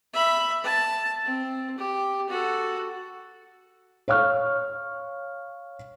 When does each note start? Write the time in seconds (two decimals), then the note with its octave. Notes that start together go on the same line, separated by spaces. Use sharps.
0.13 E5 B5
0.64 A5
1.24 C4
1.78 G4
2.29 F#4 A4
4.08 C#5 F5 C#6 F6